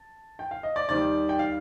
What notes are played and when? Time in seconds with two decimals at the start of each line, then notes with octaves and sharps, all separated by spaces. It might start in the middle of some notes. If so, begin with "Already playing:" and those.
Already playing: A5
0.39 G5
0.51 F5
0.63 D#5
0.76 D5
0.89 D#2 D#3 G3 D5
1.29 G5
1.39 F5